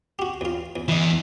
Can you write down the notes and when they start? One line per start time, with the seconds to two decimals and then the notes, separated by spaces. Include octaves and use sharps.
0.19 F#4 G4
0.41 E2 F4
0.76 E2
0.88 E2 E3 E4 D#5